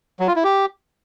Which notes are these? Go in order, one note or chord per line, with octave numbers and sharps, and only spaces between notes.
F#3
F4
E4
G4